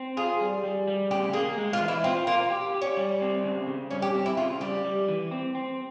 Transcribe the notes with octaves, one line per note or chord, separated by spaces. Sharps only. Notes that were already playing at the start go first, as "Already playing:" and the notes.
Already playing: C4
F4 G#4
G3
G3
G3
C#3 G4
A#3 G#4
G#3
F4
E3
E4
C4 F4
A#3 F4
G4
G4
C#4
G3
C4
C#3
C#3
G2 C#4
G4
C4
E4
C#3 F4
G3 G4
G3
E3
C4
C4